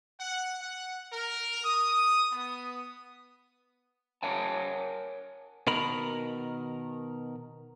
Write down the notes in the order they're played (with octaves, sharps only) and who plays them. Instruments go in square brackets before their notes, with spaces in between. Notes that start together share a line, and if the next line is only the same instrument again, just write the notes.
[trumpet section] F#5
F#5
A#4
D#6
B3
[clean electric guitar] A#4 C#5 F#5 G#5 A5
B2 D#3 A#4 B5